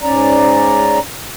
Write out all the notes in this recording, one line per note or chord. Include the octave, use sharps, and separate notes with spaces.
G#2 C#4 D5 A#5